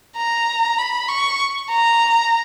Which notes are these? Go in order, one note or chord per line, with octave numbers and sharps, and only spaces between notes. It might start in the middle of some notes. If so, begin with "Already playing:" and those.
A#5
B5
C#6
A#5